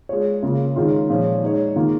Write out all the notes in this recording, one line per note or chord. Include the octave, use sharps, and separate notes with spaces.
G#3 F4 C#5
C#3 A#3 F4
D#3 G#3 C#4 F4
A#2 F3 G#3 C#4
G#3 D#4 C#5
D#3 A#3 F4 G#4